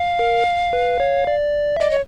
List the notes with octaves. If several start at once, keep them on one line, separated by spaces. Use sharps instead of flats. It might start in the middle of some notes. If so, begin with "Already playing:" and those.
Already playing: F5
A#4
B4
C#5
D5
E5
D5 D#5
C#5